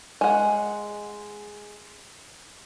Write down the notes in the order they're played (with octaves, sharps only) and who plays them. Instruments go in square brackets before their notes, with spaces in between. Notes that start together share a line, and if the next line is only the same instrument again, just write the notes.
[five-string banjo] G#3 F#5